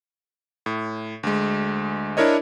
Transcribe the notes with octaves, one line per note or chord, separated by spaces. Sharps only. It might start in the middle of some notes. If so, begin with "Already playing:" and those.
A2
D2 G#3
D4 E4 A#4 C#5 D#5